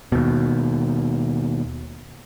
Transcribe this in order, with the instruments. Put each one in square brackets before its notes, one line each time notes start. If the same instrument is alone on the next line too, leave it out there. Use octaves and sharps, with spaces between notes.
[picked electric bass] D#2 B2